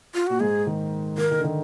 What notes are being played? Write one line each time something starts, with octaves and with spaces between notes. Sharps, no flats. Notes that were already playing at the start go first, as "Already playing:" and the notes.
F4
A#2 F#4
G#2 G#4
D#3
D#3 A#4
D#3
D3
D#3